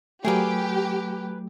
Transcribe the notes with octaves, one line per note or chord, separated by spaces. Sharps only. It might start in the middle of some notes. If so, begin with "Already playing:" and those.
F#3 A3 G4 G#4 A#4 B4